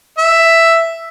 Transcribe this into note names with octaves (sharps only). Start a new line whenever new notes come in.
E5